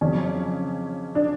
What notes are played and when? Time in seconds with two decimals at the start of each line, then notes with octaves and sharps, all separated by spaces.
0.01 F2 C#3 F#3 C#4
1.15 D4